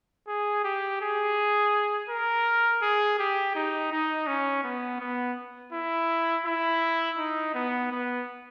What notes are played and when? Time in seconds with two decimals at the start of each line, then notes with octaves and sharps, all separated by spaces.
0.27 G#4
0.64 G4
1.01 G#4
2.09 A#4
2.82 G#4
3.19 G4
3.55 D#4
3.92 D#4
4.27 C#4
4.64 B3
5.00 B3
5.72 E4
6.45 E4
7.18 D#4
7.54 B3
7.92 B3